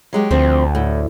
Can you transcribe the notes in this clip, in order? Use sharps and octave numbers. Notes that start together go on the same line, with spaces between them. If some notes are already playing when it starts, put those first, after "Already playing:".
F#3 G#3 G4
D2 F3 C4
A2